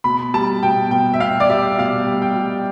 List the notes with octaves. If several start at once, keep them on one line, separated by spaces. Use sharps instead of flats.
B2 B5
G3 A5
B2 G5
B2 G5
E5
B2 F5
D5
G3 E5
B2 F5
G3
G5
G3